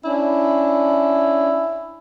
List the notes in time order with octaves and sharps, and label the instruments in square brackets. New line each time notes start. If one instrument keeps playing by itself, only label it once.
[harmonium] C#4 D4 [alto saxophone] E4